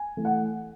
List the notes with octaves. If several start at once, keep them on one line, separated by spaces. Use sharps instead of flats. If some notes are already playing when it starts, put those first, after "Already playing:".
Already playing: G#5
E3 A3
F#5